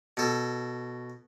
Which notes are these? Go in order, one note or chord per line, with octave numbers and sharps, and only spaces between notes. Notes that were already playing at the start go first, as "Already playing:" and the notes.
B2 A4